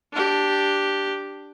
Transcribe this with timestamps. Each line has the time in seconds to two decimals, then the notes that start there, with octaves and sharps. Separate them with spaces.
0.13 D4 G4